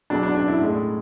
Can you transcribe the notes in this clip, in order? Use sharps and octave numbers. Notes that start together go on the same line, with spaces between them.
E2 B2 F#3 D4
D4
D4
E4
A2 G#3